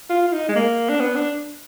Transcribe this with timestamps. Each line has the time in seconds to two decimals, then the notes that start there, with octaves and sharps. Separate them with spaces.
0.10 F4
0.28 F4
0.33 D#4
0.48 G#3
0.56 A#3
0.89 D4
1.01 B3
1.16 D4